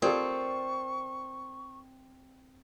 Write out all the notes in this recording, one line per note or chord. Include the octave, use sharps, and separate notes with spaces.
C4 F4 G4 A4 A#4 D5 C#6